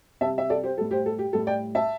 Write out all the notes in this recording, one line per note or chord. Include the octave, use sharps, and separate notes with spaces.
C3 G3 E5 A5
E5
A4 D5
G4 C5
A2 G3 A4
G4 C5
A4
G4
A2 G3 A4
D5 G5
E5 A5